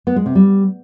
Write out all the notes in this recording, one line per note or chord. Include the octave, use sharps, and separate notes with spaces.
B3
G#3
C3
G3